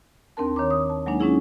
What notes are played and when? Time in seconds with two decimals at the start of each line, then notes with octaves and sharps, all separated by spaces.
0.37 D#2 C4 D4 A#4 A5
0.56 D#3 C#5 A#5 D6
0.70 D#6
0.90 A5
1.06 F#3 G#3 A#3 D4 D#4
1.20 G#3 C#4 D#4 E4 G#4